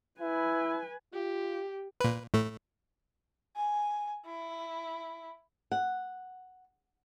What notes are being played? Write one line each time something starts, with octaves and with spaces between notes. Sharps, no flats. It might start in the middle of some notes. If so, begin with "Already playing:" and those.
E4 B4 G#5
F4 G4
A#2 B4
A2 A3
G#5
E4
F#5